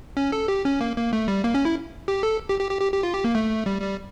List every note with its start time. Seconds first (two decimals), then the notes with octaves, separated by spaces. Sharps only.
0.17 C#4
0.32 A4
0.48 G4
0.65 C#4
0.81 A#3
0.96 A#3
1.13 A3
1.28 G3
1.44 A#3
1.55 C#4
1.65 E4
2.08 G4
2.23 A4
2.49 G4
2.60 G4
2.71 G4
2.81 G4
2.92 G4
3.03 F4
3.14 G4
3.24 A#3
3.35 A3
3.66 G3
3.82 G3